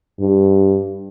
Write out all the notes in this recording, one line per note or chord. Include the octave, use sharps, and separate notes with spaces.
G2